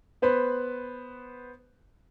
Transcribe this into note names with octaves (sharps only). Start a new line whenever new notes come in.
B3 B4 C5 B5